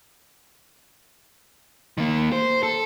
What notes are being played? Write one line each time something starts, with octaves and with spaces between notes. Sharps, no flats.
D#3 A#3
C5
A4